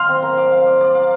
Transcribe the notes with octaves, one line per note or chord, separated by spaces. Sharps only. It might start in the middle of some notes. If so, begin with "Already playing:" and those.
Already playing: F5 C6 F6
C4
A#4
D5
F5
D5
D5
F5